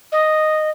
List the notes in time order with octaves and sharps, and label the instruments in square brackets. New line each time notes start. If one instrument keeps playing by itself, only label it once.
[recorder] D#5